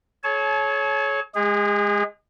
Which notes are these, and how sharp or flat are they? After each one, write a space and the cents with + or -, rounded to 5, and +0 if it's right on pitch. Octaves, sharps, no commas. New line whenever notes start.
A4 -45 C#5 +0 A5 -40
G#3 +0 G#4 -40